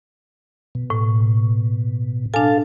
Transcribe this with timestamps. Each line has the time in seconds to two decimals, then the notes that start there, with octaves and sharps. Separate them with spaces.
0.75 B2
0.90 A2
2.34 D4 A4 F5 G#5 A5